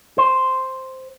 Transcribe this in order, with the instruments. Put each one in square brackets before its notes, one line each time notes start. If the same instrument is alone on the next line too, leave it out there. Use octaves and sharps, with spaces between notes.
[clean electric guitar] C5